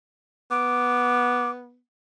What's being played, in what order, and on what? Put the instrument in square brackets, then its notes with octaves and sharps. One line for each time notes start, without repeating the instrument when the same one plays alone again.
[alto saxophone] B3 [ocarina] D6